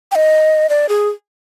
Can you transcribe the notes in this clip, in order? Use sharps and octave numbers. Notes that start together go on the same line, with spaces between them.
G5
D#5
D5
G#4